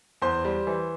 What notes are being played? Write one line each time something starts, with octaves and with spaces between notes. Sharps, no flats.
E2 C5 C6
G3
E3